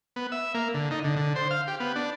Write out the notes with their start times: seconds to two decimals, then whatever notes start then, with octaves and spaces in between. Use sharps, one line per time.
0.16 B3
0.32 E5
0.54 A#3
0.74 D3
0.91 D#4
1.04 D3
1.16 D3
1.36 C5
1.51 F5
1.67 G4
1.80 B3
1.96 D4